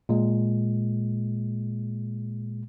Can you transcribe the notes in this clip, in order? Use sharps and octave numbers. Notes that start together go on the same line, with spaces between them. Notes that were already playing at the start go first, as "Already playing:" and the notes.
A#2 G#3